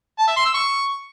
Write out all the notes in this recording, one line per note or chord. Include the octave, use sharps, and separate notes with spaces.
A5
E5
C6
E6
C#6